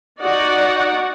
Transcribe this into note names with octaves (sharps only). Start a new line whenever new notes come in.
D#4 F#4 D5 F#5